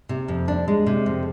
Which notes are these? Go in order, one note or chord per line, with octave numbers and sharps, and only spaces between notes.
C3
F2
D4
G#3
C3
F2